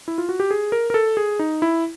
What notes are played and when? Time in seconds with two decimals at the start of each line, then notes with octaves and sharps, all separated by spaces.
0.08 E4
0.18 F4
0.29 F#4
0.40 G4
0.51 G#4
0.72 A#4
0.90 A#4
0.94 A4
1.17 G#4
1.39 D#4
1.62 E4